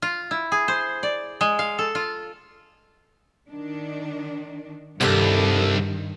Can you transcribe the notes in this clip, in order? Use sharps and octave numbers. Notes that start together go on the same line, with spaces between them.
F4
E4
G#4
C5
D5
G#3
F5
A4
F4
D#3 D4
C2 G2 C3 D#3 E4 A4